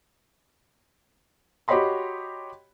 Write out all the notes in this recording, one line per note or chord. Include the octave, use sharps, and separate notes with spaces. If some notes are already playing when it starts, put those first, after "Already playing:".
F#4 G4 C#5 D#5 B5 C6